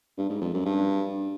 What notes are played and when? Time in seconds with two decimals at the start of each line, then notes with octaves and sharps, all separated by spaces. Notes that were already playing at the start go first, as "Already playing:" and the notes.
0.18 G2
0.30 G#2
0.42 F2
0.53 F#2
0.65 G2